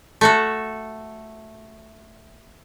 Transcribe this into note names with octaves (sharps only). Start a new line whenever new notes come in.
A3 F#4 A4